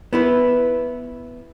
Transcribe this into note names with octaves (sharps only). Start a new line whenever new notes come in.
B3 E4 B4